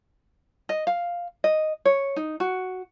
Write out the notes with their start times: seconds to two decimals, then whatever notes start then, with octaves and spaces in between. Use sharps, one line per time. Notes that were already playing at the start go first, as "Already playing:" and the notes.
0.69 D#5
0.87 F5
1.44 D#5
1.85 C#5
2.16 D#4
2.40 F#4